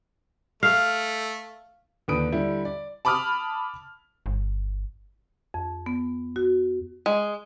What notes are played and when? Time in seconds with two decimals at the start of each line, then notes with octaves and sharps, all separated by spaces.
0.63 A3 F5
2.08 D#2 D3 F3 B4 D#6 D7
2.32 D3 G3 E4
2.65 D5
3.05 A5 B5 D6 D#6 F6
4.26 G1
5.54 F2
5.86 B3
6.36 F#4
7.06 G#3